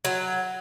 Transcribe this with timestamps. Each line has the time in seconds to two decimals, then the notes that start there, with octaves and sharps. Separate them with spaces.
0.05 F#3